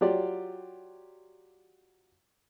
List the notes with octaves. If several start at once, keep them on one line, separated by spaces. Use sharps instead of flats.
F#3 F4 G4 D5